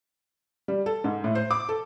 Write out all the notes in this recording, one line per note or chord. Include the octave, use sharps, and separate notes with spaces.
G3
A4
G#2
A2
C5
D6
A4